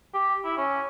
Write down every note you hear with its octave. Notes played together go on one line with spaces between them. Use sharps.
G4
E4
C#4